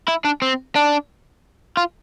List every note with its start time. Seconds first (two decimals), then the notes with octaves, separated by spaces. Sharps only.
0.08 E4
0.25 D4
0.42 C4
0.76 D4
1.77 F4